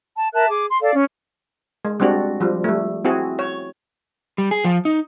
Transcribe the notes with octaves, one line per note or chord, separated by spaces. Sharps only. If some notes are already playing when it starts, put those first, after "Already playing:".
A5
A#4 E5 A5 F#6
G#4 D6
C6
A4 D5 F5
C#4
G#3
G3 G#3 C4 D4 F#4
F3 G3
G3 A3
C4 E4 F#4 G#4
C#5
G3
G#4
F3
D#4